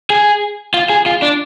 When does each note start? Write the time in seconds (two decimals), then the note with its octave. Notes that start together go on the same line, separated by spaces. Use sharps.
0.10 G#4
0.74 F4
0.89 G#4
1.06 F4
1.22 D4